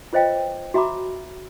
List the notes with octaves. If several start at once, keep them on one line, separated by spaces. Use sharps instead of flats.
F4 B4 C5 D#5 F5 G5
F#4 E5 A#5 B5 D6